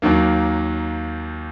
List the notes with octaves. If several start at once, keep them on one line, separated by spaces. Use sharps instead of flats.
D#2 D#3 F#3 A#3